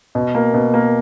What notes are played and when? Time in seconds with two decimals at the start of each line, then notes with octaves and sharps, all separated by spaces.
0.15 B2
0.35 A#3
0.54 B2
0.74 A#3